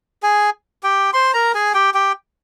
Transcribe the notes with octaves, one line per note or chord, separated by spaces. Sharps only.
G#4 G#5
G4 G5
C5 C6
A#4 A#5
G#4 G#5
G4 G5
G4 G5